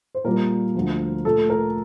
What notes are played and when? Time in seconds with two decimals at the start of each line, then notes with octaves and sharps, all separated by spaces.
0.15 C5
0.24 A#2 G3 A#3 A#4
0.75 D2 D3 F3
1.25 A#2 A3 A4
1.50 A#4